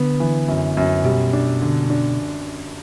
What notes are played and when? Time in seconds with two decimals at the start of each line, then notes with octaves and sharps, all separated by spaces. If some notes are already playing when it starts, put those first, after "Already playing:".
Already playing: D3 B3
0.20 E3
0.48 F#2
0.77 F#2
1.04 B2 G3
1.33 D4
1.62 D3
1.90 D4